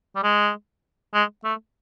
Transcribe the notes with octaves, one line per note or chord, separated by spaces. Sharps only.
G3
G#3
G#3
A3